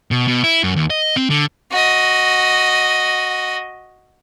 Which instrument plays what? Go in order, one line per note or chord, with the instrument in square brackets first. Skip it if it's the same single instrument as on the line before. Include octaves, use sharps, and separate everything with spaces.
[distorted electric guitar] B2
B2
E4
F#2
D#2
D#5
C4
D3
[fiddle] F#4 D#5